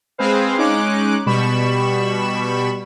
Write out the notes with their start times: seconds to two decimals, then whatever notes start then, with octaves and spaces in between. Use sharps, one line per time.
0.18 G#3 C4 G#4 B4 C5 F5
0.58 G#3 C#4 D#4 D6 F#6
1.26 B2 G3 B5 C#6 E7